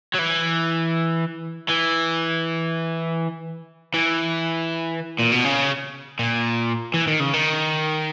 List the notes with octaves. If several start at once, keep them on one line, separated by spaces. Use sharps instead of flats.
F#3
E3
E3
E3
A#2
B2
C#3
A#2
E3
D#3
C#3
D#3